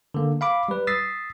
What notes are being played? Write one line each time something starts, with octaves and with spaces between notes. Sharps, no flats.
D3 A#3
F5 B5 D6
G3 B4
D#6 E6 A6 B6 C7